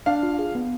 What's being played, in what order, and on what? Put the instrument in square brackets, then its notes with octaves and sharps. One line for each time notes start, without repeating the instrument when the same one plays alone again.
[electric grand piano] D4 [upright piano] F5
[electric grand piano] F4
G#4
B3